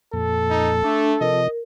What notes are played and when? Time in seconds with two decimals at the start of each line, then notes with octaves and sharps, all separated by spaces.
0.13 F2 A#2 A4
0.50 D#4
0.84 A3 D4
1.21 C3 F3 A#4 D#5